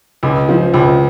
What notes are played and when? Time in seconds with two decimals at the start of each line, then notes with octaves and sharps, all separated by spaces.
0.23 C#2
0.49 F3
0.74 C#2